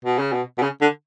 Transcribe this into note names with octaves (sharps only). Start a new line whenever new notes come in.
B2
C#3
B2
B2
C#3
D3